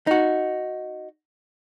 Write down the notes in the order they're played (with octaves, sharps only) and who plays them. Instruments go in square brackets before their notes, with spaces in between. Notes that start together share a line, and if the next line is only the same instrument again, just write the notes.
[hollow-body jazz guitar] D#4 F#4